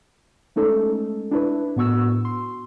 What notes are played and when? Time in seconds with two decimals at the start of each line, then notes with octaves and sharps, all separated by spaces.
0.56 G#3 A3 C#4 D#4 A4
1.31 D4 E4 B4
1.76 A2 B3 F#4 C#6 E6
2.25 C6